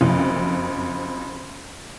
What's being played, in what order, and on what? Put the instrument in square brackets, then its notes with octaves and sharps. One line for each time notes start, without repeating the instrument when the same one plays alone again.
[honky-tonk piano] F#1 F2